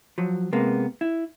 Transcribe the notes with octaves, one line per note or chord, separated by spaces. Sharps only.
F3 F#3
C3 G#3 A#3 B3
E4